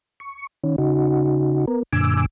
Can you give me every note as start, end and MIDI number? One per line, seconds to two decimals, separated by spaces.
0.20 0.47 85
0.64 0.76 51
0.64 0.76 61
0.78 1.65 49
0.78 1.65 63
0.78 1.65 66
1.67 1.83 59
1.67 1.83 70
1.93 2.26 42
1.93 2.26 46
1.93 2.26 50
1.93 2.26 80
1.93 2.26 86
1.93 2.26 88